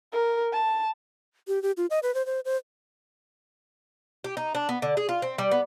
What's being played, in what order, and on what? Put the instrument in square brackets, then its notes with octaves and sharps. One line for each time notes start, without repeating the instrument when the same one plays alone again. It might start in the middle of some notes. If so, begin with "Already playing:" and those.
[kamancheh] A#4
A5
[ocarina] G4
G4
F4
D#5
B4
C5
C5
C5
[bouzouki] G4
D#4
D4
B3
D3
G#4
F4
C4
G3
B3